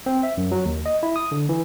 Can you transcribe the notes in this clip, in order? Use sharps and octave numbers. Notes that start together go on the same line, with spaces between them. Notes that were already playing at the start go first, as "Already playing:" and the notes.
C4
E5
F#2
F#3
D#2
D#5
E4
D#6
D3
E3